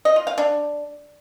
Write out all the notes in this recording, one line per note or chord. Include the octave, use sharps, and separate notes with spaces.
D#5
F4
F5
D4